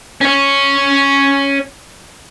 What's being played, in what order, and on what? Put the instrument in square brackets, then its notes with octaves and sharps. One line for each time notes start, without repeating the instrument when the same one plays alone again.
[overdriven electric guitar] C#4 C#5